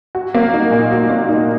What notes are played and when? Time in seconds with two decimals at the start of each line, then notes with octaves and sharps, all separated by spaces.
0.15 F#4
0.35 A#3
0.54 D#4
0.71 A#2
0.91 F#4
1.10 A#3
1.29 D#4